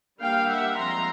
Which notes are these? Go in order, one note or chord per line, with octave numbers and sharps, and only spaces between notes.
G3 A#3 D4 F5 G5
E5 F#5
F3 G#3 C4 A#5 C6